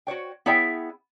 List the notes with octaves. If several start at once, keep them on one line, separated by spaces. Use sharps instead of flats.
F#4 C5 C#5 G5
B3 E4 G#4 C#5 E5 G5